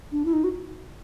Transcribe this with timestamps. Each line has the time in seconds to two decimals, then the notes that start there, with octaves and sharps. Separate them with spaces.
0.12 D4
0.25 E4
0.33 D#4
0.44 F#4